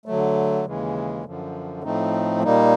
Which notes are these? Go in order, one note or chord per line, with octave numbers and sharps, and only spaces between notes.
D3 F#3 A3
D#2 C#3 E3 G#3
F#2 D3 F3
A2 F3 A3 C4 D#4
A#2 G3 A#3 D#4